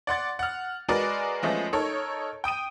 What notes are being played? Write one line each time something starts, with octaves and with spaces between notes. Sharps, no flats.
D5 F#5 C6 A6
F#5 F6
G#3 F#4 A#4 B4 D5
F3 G#3 A3 B3 C#4
D#4 A4 A#4 C#5
G5 D#6 D7 D#7